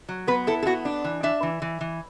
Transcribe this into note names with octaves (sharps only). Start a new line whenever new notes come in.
F#3
B3 B4
E4 A4
A4
B3 F#4
D4
E3
D4 E5
E3
E3
E3